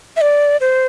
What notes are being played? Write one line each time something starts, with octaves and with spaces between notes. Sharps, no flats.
E5
D5
C5